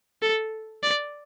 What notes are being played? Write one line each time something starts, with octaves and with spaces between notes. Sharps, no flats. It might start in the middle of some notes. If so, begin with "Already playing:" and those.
A4
D5